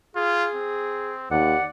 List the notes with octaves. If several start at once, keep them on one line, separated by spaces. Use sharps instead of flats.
F4 G#4
C4
D#2 D5 F#5